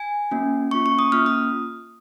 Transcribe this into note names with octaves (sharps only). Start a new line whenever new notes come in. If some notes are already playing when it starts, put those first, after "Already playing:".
Already playing: G#5
A#3 C#4 F#4
A#3 C#4 F4 C#6
C#6
D#6
A#3 C#4 F4 F6
D#6